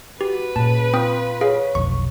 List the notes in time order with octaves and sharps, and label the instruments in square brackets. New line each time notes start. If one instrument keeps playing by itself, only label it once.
[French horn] F#4 [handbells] G4 [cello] B4
[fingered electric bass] A#2 [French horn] C#3 [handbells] A5
[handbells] C4 G5 D#6 [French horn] F4
[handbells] G#4 F5 [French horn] C#5
[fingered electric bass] F1 B1 F2 [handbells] C#6